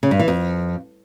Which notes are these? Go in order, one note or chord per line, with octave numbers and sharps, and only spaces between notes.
C#3
G2
E3
F2